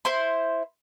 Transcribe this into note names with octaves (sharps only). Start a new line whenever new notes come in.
E4 C5 C6